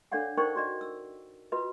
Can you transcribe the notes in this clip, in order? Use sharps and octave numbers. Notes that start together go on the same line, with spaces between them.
D4 A4 C#5 D5 F5 F#5
D#4 A#4 C5 D5 G5 C#6
F#4 D5 D#5
E6
F4 F#4 B4 D#5